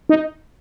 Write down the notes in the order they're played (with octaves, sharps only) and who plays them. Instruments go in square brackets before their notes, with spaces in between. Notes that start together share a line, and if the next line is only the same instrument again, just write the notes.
[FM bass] D#4